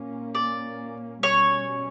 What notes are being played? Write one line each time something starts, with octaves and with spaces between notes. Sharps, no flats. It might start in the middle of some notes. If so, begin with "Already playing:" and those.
Already playing: A#2 A#3 C#4
D5
B2 G3 C#4 C#5